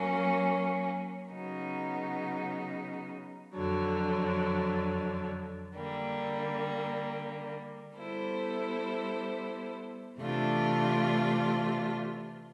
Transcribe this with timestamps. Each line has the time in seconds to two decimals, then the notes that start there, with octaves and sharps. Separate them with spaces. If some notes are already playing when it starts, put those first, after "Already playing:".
Already playing: F#3 A#3 C#4
1.33 C#3 F#3 B3 D#4
3.54 F2 D3 F#3
5.75 D3 G3 A#3
7.97 G3 B3 E4 A4 C5
10.18 C3 E3 A3 D4 F4